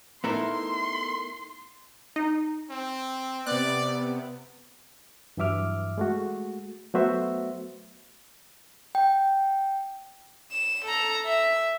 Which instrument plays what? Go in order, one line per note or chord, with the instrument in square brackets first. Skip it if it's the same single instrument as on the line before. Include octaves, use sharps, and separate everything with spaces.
[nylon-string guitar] A3 D#4 E4 [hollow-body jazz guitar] B3 A4 A#4 [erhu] C6
[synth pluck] D#4
[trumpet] C4
[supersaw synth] C3 B3 [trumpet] D5 [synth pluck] F#6
[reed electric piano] G2 E3 F#3 E5 D6 F6
G#3 A3 F#4
F#3 A3 B3 F#4 C5 E5
[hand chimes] G5
[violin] E7
A4 A#5
E5